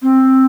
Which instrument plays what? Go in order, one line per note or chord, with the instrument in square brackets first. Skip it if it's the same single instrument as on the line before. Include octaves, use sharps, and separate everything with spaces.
[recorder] C4